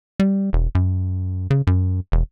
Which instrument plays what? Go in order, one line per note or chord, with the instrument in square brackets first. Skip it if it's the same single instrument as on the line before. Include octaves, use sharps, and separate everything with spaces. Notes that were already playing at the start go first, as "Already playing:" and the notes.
[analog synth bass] G3
E1
F#2
C#3
F#2
E1